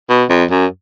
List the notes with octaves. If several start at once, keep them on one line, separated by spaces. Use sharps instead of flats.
B2
F2
F#2